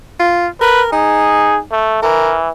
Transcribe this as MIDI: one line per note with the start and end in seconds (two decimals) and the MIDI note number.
0.20 0.47 65
0.61 0.91 70
0.61 0.82 71
0.92 1.66 63
0.92 1.58 68
1.71 2.02 57
2.03 2.49 52
2.03 2.35 70